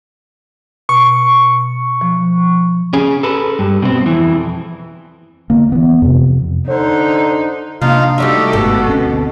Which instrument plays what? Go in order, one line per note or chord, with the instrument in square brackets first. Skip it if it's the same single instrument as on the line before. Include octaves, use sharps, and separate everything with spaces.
[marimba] B2 [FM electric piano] C#6
[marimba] F3
[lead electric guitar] C#4 G#4
A4 B4
G2
B2 C4
F2 E3
[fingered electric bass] D3 A#3
E3 B3
F2 C3
[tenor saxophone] D3 [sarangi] D#4 [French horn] C5
[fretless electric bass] C3 A#3 D4 [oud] F3 [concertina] D#4 F4 F5
[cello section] G3 D#4 G4 [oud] A3 D5 E5 [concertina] F#4
[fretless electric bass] G1 G#2 A3 [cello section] B2 [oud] A4
[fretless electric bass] D2 C4 C#4